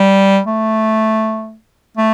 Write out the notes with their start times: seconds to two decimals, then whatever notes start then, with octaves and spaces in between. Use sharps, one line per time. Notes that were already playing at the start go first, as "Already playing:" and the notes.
Already playing: G3
0.47 A3
1.98 A3